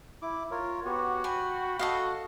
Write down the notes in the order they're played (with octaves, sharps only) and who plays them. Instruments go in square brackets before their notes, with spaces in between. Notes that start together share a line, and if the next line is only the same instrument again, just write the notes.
[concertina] E4 D6
F4 A#4 C#5
[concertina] B3 G4 C#5 [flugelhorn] F#4
[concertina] G5 B5 [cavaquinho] G#5
[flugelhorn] F#4 [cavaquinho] A4 D#5 F5